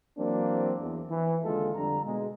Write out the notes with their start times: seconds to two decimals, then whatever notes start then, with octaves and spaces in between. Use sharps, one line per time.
0.18 E3 F#3 A#3 C4 D4
0.81 E2
1.10 E3
1.44 D#2 D3 G#3 F4 A4
1.75 F2 D3 G3 A#5
2.05 B2 G#3